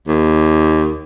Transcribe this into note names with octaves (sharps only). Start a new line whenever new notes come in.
D#2